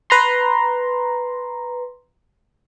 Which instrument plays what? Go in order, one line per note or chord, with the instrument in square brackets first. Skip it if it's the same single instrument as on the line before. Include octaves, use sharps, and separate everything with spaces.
[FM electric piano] B4 A#5 C6